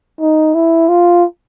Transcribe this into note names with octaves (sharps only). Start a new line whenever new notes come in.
D#4
E4
F4